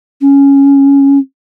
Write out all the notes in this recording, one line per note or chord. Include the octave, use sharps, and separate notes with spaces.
C#4